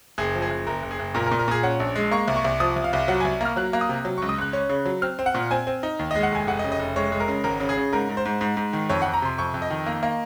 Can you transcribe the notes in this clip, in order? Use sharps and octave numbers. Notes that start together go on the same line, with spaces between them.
F#1 G#4
F3
G#4
F#1
F#1 A#4
F#1
G#4
F#1
A#2 A#4
A#4
A#2
A#4
A#2 G#4
C#4 F#5
A#1
G#3
A#3 C#6
C2
C#6
C2
F3 D#6
C2
F5
C2
F#3 F#5
C2 G#5
A#3 F6
F#3 F#6
A#3
D#6
C3
F#3
C#2 C#6
D#6
C#2 F#6
C#4
C#3
F#3
C4 F6
C4
F#5
A#2
C4 G#5
C4
D#4
D#2
G#3 D#5
F#5
F1 G#5
F1 F#5
D#5
C#3
D#5
F1
G#3 C#5
G#3
A#4
C#3
G#1 A#4
C#3
G#4
C#3
G#2 A#4
G#2
C5
G#2
G#2
G#2
D#3
F2 C#5
F2 F#5
A#5
C3 C6
F2 C#6
F2
D#5
D#3
A#3
A#3